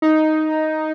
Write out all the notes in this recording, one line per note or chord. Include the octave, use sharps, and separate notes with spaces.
D#4